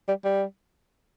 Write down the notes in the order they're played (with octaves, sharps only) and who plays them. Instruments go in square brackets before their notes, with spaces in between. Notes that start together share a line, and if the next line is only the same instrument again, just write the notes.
[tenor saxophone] G3
G3